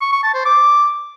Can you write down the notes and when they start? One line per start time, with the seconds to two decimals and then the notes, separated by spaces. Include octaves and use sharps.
0.01 C#6
0.12 C#6
0.23 A5
0.34 C5
0.45 D6